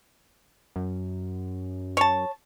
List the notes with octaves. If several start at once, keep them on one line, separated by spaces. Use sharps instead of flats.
F#2
C#5 A5